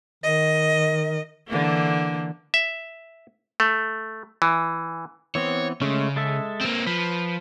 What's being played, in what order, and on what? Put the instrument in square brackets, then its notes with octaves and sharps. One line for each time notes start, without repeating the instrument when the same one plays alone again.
[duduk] D#3 [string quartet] D#5
[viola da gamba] D3 E3 A#3
[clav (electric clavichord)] E5
A3
E3
[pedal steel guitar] E3 B3 C4 [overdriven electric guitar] C#5
[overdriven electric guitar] C#3 [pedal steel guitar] G#3 A3 C#4
[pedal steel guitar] G#3 A4 E5
[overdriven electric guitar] A#3 C4
[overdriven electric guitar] F3 [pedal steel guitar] B4